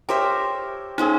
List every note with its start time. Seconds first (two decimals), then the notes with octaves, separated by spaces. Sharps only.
0.09 G4 A#4 C5 C#5 E5 A5
0.98 A#3 C4 C#4 D#4 G#4 A5